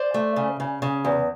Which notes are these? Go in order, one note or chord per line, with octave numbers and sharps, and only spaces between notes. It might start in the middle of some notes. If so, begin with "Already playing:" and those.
Already playing: C5 D5
A3
C#3
C#3
C#3
E2